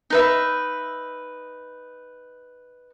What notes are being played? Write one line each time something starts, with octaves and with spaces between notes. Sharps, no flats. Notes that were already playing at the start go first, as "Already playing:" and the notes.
D#4 B4 E5